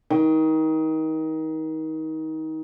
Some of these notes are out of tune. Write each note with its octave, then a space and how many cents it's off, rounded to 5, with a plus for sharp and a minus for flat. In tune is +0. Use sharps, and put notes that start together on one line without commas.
D#3 +25